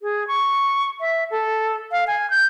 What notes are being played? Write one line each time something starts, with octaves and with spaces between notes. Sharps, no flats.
G#4
C#6
E5
A4
F5
G#5
G6